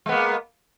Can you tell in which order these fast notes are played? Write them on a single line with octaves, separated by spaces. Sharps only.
G#3 B3 A#3